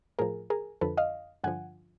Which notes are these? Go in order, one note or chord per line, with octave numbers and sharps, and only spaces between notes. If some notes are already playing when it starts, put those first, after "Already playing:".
A2 F3 G#4 A#4
G#4 A#4
F2 D3 F3 A4 B4
D#5 F5
G2 D3 F3 F#5 G#5